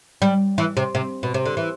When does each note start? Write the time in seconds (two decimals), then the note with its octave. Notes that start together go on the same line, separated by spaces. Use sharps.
0.22 G3
0.58 E3
0.77 C3
0.95 C3
1.23 B2
1.34 C3
1.46 D3
1.57 E3